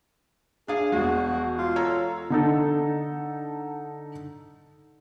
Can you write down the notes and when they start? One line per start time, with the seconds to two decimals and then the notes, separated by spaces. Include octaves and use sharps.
0.68 D4 G#4 F5
0.92 E1 G#3 F#4
1.58 F4
1.76 A4 C#5 A#5
2.30 D3 D#4 A4